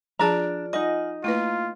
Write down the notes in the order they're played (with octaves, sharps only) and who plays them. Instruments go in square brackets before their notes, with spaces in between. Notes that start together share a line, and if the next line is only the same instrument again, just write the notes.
[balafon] F3 G#4 A5 [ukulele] D4 A#5 [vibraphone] F4 D5
[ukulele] D#4 D#5 [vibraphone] F4 F#5 G#5
[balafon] A3 E4 B4 [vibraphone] A#3 [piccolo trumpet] F4